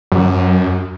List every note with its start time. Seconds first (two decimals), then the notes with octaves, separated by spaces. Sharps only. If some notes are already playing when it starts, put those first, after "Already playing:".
0.12 F#2